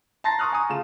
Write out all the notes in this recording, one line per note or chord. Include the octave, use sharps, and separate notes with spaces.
A5 A#5 C6 A6 A#6 C7
A#5 C6 C#6 D#6 F6 F#6
G#5 A#5 C#6 D#6
C#3 A3 F4 E7